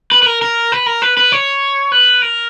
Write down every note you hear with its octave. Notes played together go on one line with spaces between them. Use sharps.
B4
B4
A#4
A#4
B4
A#4
B4
B4
C#5
B4
A#4